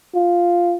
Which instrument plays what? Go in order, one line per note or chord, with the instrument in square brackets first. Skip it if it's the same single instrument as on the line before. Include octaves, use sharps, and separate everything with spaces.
[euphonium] F4